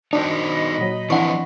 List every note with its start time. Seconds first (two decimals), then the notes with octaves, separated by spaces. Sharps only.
0.13 D4 D#4 F#4 C5 D#5 G5
0.27 D#5 B5
0.78 A#2 F#3
1.10 E3 F3 C4 D4 E4 D5 F#5 C#6